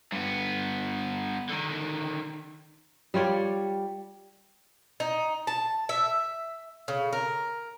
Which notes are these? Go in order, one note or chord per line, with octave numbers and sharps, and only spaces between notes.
G2 B3
D3 D#3
G3 F4 C#5 D5
D#4
A5
E5
C#3
A#4